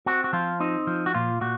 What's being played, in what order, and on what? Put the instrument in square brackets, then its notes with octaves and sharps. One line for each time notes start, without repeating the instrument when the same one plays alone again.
[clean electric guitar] C4 F#4
F#4
F3 F4
C4 D#4
F3
F#4
A#2 F4
A#2 F#4